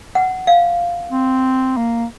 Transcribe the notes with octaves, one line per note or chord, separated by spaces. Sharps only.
F#5
F5
C4
A#3